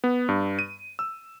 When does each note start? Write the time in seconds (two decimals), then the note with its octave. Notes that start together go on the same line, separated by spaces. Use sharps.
0.04 B3
0.29 G2
0.59 D#7
0.99 E6